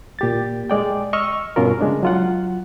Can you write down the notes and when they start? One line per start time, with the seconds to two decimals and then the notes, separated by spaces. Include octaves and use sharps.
0.19 A#2 G4 A6
0.70 G#3 D5 G5
1.13 D#5 C#6 E6 F6
1.56 G2 B2 C#4 F4 A#4
1.81 C#3 G#3 D4
2.03 F#3 F4 F#5